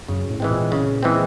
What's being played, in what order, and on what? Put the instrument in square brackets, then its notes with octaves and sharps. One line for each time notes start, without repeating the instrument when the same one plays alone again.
[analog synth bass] F#2 [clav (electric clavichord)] C#3
[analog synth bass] A2
[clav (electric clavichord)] E3 G#3 C4
[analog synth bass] A#2
[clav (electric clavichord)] C#3
E3 G#3 C4